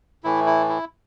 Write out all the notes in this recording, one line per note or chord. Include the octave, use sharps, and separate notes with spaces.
A2 E3 A3 E4
E4
E4